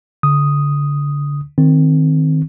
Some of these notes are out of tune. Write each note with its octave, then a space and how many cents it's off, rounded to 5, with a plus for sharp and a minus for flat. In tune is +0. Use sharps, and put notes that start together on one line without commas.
D3 -30 D#6 +0
D#3 +0 C4 +0